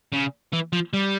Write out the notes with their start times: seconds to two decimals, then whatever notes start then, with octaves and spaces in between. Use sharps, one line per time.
0.13 C#3
0.53 E3
0.73 F3
0.93 G3